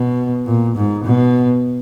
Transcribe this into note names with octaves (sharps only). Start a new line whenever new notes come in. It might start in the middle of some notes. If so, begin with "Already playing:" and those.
Already playing: B2
A#2
G#2
B2